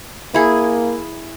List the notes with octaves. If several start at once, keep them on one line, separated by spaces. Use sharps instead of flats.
A#3 E4 G#4